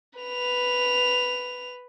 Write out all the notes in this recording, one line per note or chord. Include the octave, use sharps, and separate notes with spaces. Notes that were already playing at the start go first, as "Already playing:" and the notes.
B4 F7